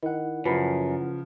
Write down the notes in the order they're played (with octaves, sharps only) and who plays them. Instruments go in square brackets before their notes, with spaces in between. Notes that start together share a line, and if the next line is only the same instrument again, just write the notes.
[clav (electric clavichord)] D#3 [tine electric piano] E4 F#5
[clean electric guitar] F#2 [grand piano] C#3 F3 [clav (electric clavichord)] B4